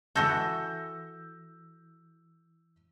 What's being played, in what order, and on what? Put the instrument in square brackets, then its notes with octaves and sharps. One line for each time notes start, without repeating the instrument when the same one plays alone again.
[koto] E3 F#4 A4 [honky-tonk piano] E6 G6 A#6